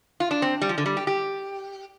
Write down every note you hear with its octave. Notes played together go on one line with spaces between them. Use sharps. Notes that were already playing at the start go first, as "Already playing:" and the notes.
F4
D4
C4
G3
F3
D3
G3
G4
G4